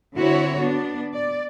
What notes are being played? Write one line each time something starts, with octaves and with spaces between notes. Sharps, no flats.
D3 C4 E4 F#4 C#5
B3 D4
D5